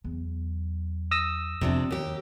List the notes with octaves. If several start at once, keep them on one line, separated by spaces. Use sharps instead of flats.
E2 F#3
D#6 E6 A#6
F2 C3 F3 B3 D4
D#2 G4